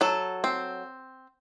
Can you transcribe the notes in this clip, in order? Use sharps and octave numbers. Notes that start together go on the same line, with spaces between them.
F#3 A4
C4